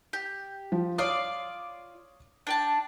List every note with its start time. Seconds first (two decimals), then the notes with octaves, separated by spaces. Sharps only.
0.13 G4
0.72 F3
0.98 F4 C#5 D5 F5 D6 D#6
2.47 D4 G5 A5